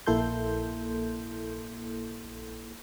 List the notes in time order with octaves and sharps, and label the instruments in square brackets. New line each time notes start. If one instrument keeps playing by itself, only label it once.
[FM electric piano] A#1 A#3 E4 A4 C6 G6